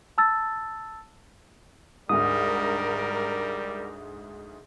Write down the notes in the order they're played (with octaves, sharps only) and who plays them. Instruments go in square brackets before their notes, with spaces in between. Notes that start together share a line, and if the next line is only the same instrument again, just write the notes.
[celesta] A5 E6 A6
[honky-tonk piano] D2 G#2 [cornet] G3 [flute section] A#4 [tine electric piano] D#6